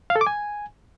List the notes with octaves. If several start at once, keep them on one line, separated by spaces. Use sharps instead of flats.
F5
A4
D6
G#5